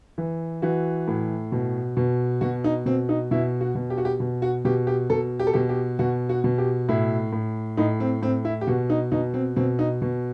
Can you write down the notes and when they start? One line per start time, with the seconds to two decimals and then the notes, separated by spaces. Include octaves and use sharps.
0.18 E3
0.62 E3 F#4
1.08 A2
1.52 B2
1.97 B2
2.41 B2 F#4
2.64 D#4
2.86 B2 C4
3.09 D#4
3.31 B2 E4
3.61 F#4
3.75 B2
3.90 G4
3.98 F#4
4.05 G4
4.20 B2
4.42 F#4
4.65 B2 G4
4.87 G4
5.10 B2 A4
5.40 G4
5.47 A4
5.53 B2 G4
5.69 G4
5.99 B2 F#4
6.29 F#4
6.44 B2
6.58 G4
6.89 A2 E4
7.33 A2
7.77 A2 D#4
8.00 C4
8.22 A2 C4
8.45 E4
8.61 G4
8.67 B2 F#4
8.90 D#4
9.12 B2 D#4
9.34 C4
9.56 B2 C4
9.79 D#4
10.02 B2